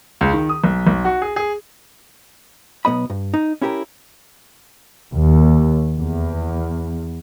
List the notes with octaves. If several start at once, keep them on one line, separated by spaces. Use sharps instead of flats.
C#2
D#3
D#6
B1
B1
F#4
G#4
G#4
B1 A#2 B3 D#5 B5
G2
D#4
C#4 E4 G4 G#4 A#4
D#2
E2